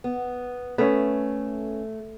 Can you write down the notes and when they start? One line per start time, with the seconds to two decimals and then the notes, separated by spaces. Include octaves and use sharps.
0.04 B3
0.78 A3 B3 C#4